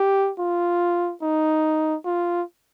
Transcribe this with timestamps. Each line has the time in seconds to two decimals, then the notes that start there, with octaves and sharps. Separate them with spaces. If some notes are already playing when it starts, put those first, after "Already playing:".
Already playing: G4
0.39 F4
1.22 D#4
2.05 F4